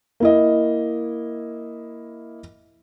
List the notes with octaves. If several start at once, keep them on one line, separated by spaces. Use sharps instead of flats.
A#3 E4 D#5